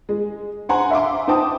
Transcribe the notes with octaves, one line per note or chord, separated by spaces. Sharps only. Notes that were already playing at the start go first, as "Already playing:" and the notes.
G#3
C5 F#5 G#5 A#5 C6
E5 F5 C6 D6
D#4 C5 G5 A5 D6 D#6